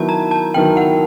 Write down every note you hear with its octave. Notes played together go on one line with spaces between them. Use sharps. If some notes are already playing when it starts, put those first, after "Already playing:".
Already playing: D#3 F#3 B3 E4 A5
A#5
A5
D#3 F#3 B3 E4 G5
F#5